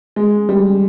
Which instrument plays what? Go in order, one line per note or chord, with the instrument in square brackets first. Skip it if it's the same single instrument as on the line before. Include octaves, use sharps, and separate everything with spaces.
[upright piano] G#3
G3